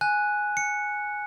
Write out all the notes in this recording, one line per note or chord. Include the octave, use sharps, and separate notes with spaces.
G#5 F#6
C#7